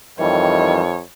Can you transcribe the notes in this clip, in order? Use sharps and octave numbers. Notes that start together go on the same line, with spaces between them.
F2 D#3 E3 G3 C#5